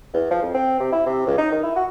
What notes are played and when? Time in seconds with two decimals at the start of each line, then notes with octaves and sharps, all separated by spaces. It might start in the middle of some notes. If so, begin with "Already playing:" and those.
0.14 E2
0.31 F3
0.42 F2
0.54 C4
0.80 C3
0.92 E4
1.06 C3
1.26 C#2
1.38 D#4
1.51 D#3
1.63 E4
1.76 F#4